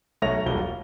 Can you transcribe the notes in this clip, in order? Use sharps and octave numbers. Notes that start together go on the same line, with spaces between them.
B1 A3 C#5 E5 A#6 F7
E1 B1 G3 A#3 G7
F4